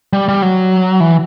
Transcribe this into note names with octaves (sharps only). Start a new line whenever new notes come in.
G3
G3
F#3
E3